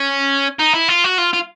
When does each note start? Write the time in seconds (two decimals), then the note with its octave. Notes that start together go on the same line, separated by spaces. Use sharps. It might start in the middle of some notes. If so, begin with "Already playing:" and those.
Already playing: C#4
0.59 D#4
0.74 E4
0.88 F4
1.04 F#4
1.18 F4
1.34 F4